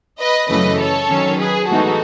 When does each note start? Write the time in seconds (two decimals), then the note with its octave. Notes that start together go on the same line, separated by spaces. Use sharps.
0.18 B4 D#5
0.48 F#2 C#3 E3 A3 B4 D#5
0.79 A4 C#5
1.08 D#3 F#3 C#4
1.39 G#4 B4
1.69 A2 E3 G#3 B3 D#4 F#4 A4